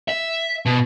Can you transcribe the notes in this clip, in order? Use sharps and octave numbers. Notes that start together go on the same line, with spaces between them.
E5
B2